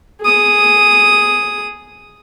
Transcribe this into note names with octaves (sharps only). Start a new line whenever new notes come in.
G#4 D#6